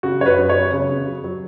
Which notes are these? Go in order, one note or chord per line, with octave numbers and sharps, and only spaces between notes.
C#3 F#4
F#2 C#5
B4
F#2
C#5
F#2
C#3
C#3
F#3
F#3